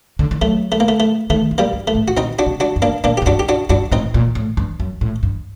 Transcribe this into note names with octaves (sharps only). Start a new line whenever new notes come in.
D3
D#3
F#3 A3
A3
A#3
A3
A3
D#3 A3
G2
G3 A#3
G2
A3
A2
F#4
A#2 C4 D#4
D4 F#4
C3
D4 F#4
G2
A#3 D4
A#2 A#3 D4
G4
A2
G2 D4 F#4
G4
D4 F#4
G2 D4 F#4
A2 C4 D#4
A#2
A2
G2
F#2
A2
G2